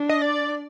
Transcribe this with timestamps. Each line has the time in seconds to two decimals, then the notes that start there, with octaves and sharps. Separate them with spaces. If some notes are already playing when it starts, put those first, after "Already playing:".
Already playing: D4
0.09 D#5
0.22 D5